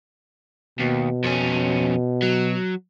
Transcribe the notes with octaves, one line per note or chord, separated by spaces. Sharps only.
D#2 B2
F2 C#4
F#3